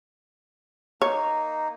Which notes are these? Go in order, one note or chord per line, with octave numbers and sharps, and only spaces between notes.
A#3 D#4 C#5